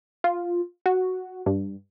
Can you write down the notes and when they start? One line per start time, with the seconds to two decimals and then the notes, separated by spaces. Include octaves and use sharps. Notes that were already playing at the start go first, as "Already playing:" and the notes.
0.24 F4
0.86 F#4
1.46 G2